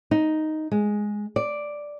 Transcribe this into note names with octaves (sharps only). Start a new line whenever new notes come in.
D#4
G#3
D5